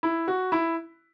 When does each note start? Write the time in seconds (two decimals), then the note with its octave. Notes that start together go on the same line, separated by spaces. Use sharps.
0.03 E4
0.28 F#4
0.52 E4